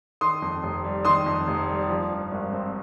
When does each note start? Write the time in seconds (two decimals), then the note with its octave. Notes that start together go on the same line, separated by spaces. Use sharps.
0.21 D#3 C6 D#6
0.42 F2
0.63 F1
0.84 G3
1.05 D#3 C6 D#6
1.26 F2
1.47 F1
1.68 G3
1.89 F3
2.10 G2
2.32 G#1
2.53 C4